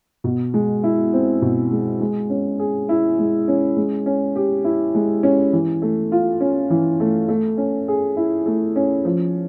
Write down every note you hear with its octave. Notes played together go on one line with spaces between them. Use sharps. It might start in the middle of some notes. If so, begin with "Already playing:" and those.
B2
G#3
E4
C4
B2
G#3
G#3
C#4
G#4
E4
G#3
C#4
G#3
C#4
G4
E4
G#3
C#4
E3
A3
F4
C#4
E3
A3
A3
C#4
G#4
E4
A3
C#4
F3